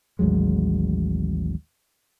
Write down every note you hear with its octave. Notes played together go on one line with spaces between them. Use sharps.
A1 D#2 F#3 G#3